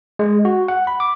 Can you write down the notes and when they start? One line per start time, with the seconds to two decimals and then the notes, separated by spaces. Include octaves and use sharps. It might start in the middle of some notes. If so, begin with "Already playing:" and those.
0.19 G#3
0.45 F#4
0.68 F#5
0.87 B5
1.00 D6